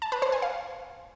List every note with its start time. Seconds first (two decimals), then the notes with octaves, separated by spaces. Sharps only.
0.02 A5
0.12 B4
0.22 C5
0.32 G#5
0.42 F5